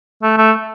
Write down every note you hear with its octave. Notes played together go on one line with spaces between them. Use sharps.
A3
A3